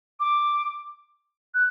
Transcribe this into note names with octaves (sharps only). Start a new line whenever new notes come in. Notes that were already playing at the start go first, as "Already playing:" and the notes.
D6
F#6